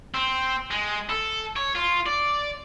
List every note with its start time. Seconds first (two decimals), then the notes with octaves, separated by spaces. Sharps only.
0.14 C4
0.71 G#3
1.10 A4
1.56 C#5
1.75 F4
2.06 D5